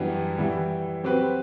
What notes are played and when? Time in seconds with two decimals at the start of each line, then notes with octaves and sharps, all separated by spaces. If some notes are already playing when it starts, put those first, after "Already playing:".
Already playing: F#2 E3 G3 B3 D4
0.38 E3 G3 B3 E4
1.03 F#3 C4 G4 B4